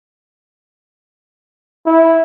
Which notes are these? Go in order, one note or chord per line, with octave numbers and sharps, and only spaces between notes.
E4